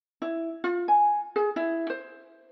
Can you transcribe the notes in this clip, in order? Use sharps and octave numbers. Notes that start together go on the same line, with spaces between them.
E4
F4
G#5
G#4
E4
C5